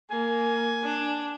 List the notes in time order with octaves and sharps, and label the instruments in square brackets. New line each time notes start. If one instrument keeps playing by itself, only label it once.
[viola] A#3 [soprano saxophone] G#5
[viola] D4